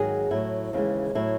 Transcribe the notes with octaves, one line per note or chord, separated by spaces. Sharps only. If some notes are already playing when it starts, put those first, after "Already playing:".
Already playing: G#2 D#3 F#3 G#4
A2 F#3 E4
D#2 C#3 E3 G#3
A2 F#3 E4